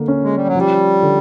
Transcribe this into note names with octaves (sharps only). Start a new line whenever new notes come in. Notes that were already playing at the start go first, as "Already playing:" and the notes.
Already playing: D3 A#3
C#4
G#3
G3
F#3
F3 G3
D3